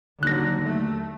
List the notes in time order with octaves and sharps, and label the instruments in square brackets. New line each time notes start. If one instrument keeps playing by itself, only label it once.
[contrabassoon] D#2 [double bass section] D3 F#3 [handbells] F#6 A#6
[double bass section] A3